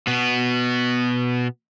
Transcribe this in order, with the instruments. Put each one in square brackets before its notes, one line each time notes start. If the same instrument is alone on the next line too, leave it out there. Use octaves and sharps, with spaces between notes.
[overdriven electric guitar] B2 B3